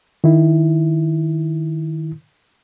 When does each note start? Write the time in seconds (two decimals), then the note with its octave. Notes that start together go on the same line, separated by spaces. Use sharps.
0.24 D#3 E4